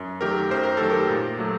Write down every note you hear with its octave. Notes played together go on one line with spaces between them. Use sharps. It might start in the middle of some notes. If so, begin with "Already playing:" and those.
Already playing: F#2
D#3 F#3 A3 G4 A#4
F#2 C5
A#4
D#3 F#3 A3 A4
G4 A#4
A#2
F#3 A3